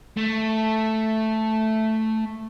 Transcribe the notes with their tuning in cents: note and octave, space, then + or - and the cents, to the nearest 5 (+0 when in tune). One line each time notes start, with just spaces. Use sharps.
A3 +0